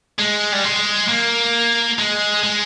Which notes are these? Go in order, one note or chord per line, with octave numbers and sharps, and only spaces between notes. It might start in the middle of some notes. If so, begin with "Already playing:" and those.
G#3
G3
G#3
A#3
G#3
G#3